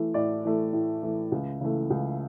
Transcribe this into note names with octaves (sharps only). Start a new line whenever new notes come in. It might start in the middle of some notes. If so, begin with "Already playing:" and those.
Already playing: E3 A3
A2 D5
E3 A3
A2
E3 A3
C#2
C#3 E3 A3
C#2